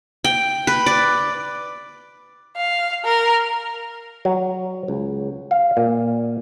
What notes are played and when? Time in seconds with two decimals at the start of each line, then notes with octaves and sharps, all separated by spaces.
0.24 G5
0.67 B4
0.86 D5
2.57 F5
3.04 A#4
4.25 F#3
4.88 C#2
5.51 F5
5.77 A#2